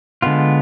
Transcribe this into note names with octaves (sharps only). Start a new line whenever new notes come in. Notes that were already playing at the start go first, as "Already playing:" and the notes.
D3 G#3 B3 F4